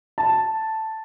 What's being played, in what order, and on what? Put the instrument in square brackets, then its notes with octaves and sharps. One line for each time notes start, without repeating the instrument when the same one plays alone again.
[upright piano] A5